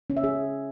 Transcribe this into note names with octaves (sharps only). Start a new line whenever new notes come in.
C#4
E5
G#4